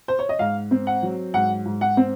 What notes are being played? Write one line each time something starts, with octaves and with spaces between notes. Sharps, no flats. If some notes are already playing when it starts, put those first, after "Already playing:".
C5
C#5
D#5
G#2 F5
C4
F#5
F#3
G#2 F#5
G#2
F#5
C4